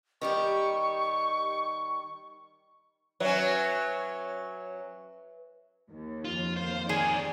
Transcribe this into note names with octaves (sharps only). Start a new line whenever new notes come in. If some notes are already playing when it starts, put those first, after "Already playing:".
D#3 G3 G4 C#6
F#3 C#4 B4 E5
D#2
F2 F4
D#2 C5 F5
A2 D#3 G#4 D5